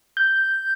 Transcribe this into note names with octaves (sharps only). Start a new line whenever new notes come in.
G6